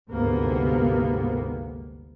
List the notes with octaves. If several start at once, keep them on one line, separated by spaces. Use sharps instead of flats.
G1 D2 G#2 C3 A#3 B3